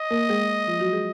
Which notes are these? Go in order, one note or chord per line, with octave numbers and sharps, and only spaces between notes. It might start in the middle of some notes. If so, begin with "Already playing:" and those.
Already playing: D#5
A#3 A#4
G#3 G#4
F3 F4
F#3 F#4
G#3 G#4